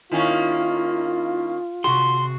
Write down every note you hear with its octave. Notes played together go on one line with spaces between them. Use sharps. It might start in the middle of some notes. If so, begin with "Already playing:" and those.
D#3 A#3 C#4 E4 F4
C3 F#4 G#4 C6